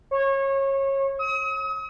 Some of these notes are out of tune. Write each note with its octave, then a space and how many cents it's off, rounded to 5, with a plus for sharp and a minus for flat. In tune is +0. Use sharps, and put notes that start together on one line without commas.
C#5 -25
D#6 +40